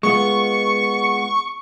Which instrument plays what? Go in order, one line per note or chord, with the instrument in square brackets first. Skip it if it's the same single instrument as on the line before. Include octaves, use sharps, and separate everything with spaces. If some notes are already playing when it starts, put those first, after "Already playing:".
[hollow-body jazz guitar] G#3 B3 F4 [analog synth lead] C#6